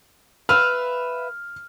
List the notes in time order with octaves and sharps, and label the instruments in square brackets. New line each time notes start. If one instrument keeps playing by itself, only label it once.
[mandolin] B4 E5 F5 [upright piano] F6